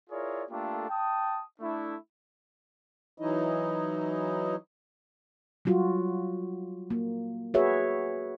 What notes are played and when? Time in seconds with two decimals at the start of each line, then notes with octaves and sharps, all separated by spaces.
0.10 E4 F4 G#4 A#4 C#5 D5
0.51 A3 A#3 D4 F4 G4 A4
0.89 G5 A5 D#6
1.60 A3 D4 E4
3.18 E3 F#3 D#4 E4 D#5
5.65 F#3 G3 F4 F#4
6.91 A#3
7.54 F#4 G#4 B4 C#5 E5